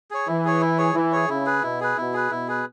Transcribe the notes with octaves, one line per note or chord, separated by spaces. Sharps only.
G#4 C#5
E3 E4
G#4 C#5
E4
G#4 C#5
E3 E4
G#4 C#5
C#3 E4
G#4 B4
B2 E4
G#4 B4
B2 E4
G#4 B4
B2 E4
G#4 B4